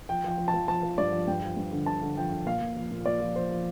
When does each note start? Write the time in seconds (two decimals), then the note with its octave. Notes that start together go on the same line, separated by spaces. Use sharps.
0.09 F3 G5
0.24 F3 G5
0.38 F3
0.48 A5
0.54 F3
0.68 F3 A5
0.83 F3
0.98 G2 D5
1.12 F3
1.28 G2 G5
1.42 F3
1.57 G2
1.72 D3
1.86 D3 A5
2.02 D3
2.17 F3 G5
2.31 D3
2.46 A#2 F5
2.61 A#2
2.77 F3
2.91 A#2
3.06 A#2 D5
3.20 F3
3.35 F3 C5
3.50 F3